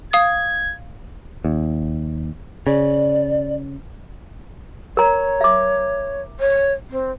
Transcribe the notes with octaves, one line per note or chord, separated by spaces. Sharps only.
F5 D#6 G#6
D#2
C#3 D5
A#4 C#5 A#5
E5 D6
C#5
C4